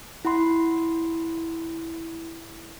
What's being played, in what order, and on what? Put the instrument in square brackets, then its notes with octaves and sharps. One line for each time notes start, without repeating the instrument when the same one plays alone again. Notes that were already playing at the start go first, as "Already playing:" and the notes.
[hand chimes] E4 F#5 B5 C6